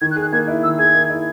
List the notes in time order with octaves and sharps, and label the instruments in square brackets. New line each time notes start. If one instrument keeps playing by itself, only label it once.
[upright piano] D#3 [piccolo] G#6
[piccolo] F#6
[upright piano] G#4
[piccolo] F#6
[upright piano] A#3 [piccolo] G#6
[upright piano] E4
[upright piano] D#3 [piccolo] E6
[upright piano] G#4 [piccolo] G#6
[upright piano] A#3
E4